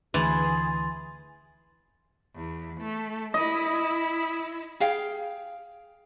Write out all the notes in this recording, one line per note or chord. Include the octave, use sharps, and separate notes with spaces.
D2 E3 G#4 C6 A6
E2
A3
E4 D#5 E6
G#4 F5 G5